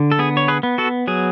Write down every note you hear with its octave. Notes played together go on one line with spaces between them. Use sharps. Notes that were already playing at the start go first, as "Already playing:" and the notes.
Already playing: D3
A4
B3 G#4
C#5
G#4 B4
B3
F#4 A4
F#3 G#4